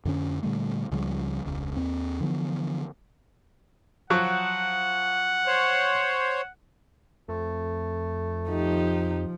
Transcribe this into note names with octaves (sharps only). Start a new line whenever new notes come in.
F2 D3 C#4
A#2 D3 G3 A3
C#2 C#3 F3 G3
E1 C#2
D#2 C4
D3 E3 F3 B3
F3 F#3 F#4 F#5
C5 C#5
F2 A3
F3 D#4 G4